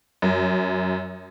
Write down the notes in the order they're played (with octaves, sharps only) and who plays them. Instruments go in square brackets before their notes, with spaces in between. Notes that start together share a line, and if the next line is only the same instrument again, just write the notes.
[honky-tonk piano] F#2